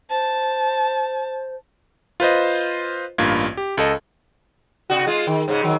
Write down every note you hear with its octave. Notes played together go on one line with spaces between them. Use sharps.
C5 A5
F4 B4 C5 D#5
A1 G2 A#3 F4 G#6
G4
C#2 A4 D#5
C3 F#4
G#3 F4
D#3
G#2 C#3
D#3 F#3